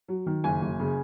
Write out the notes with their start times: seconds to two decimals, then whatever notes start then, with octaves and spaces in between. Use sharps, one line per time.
0.08 F#3
0.26 D#3
0.44 F#1 G#5
0.62 F#1
0.80 C#3